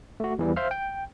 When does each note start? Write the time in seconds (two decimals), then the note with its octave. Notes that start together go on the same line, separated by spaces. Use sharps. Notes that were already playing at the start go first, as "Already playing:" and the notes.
0.20 A3 F#4
0.39 E2 E3 G3
0.56 C5 E5 F5 F6
0.71 G5